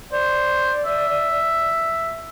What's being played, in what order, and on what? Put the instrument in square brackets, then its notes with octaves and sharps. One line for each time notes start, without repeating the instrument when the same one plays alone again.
[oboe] C5 [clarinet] D5
[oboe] E5